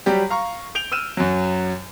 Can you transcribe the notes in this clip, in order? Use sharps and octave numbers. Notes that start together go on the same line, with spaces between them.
F#3 G3 G4
F5 A#5 C#6
G6 D7 F7 G7
E6 F6 D#7 E7
F#2 F#3